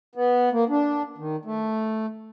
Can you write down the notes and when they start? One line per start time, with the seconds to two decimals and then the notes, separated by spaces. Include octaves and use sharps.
0.15 B3
0.52 A#3
0.69 D4
1.18 D#3
1.45 A3